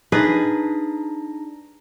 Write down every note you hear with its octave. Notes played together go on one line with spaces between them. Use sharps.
D4 D#4 G#4 B4 D#5 A#6